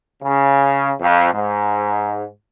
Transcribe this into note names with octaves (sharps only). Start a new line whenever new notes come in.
C#3
F2
G#2